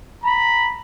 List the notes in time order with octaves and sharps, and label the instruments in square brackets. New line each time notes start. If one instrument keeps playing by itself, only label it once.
[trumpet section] A#5 B5